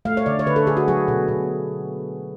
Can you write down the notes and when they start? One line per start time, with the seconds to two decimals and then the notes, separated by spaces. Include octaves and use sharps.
0.05 A3 F5
0.17 C#5
0.26 D3 D5
0.39 C#5
0.46 D3 B4
0.56 A4
0.67 D3 G#4
0.77 F#4
0.88 F#3 G#4
1.08 B2
1.28 B2